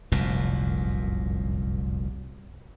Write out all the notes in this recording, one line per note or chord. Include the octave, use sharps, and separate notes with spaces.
F1 C2 F#2 A#2